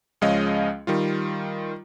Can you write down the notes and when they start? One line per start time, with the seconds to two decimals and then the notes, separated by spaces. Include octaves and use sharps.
0.21 C#2 F3 G#3 C#4 D#5 F5
0.87 D#3 G3 F4